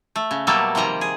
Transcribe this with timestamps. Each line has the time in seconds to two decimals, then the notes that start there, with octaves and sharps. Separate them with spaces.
0.16 A3
0.31 C#3
0.47 B2 F#3 G3 A3 A#3 A4
0.75 C3 D#3 F3 G3 A#5
1.01 G#4